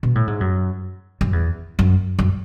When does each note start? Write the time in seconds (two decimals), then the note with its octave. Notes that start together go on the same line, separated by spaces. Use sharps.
0.03 B2
0.15 A2
0.27 G#2
0.40 F#2
1.21 F#2
1.33 E2
1.79 F#2
2.19 F#2